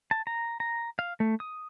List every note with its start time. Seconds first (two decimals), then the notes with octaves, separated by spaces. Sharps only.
0.11 A5
0.27 A#5
0.60 A#5
0.99 F5
1.20 A3
1.40 D#6